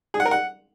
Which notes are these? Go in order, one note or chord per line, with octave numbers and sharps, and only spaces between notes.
G#4
F#5
A#4
F#5